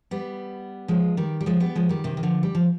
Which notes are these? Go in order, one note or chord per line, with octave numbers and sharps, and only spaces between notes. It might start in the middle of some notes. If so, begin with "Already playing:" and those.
G3 B3
F3 G#3
D#3 G3
G3
F3 G#3
G3 B3
F3 G#3
D#3 G3
C3 D#3
D#3
D3 F3
G3
F3